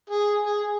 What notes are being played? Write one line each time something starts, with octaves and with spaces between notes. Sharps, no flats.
G#4
G#4